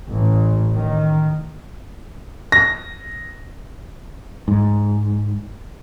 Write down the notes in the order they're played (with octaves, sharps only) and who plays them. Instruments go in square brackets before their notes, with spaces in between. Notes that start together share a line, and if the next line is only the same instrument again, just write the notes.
[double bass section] A1
D#3
[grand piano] A#6
[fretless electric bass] G#2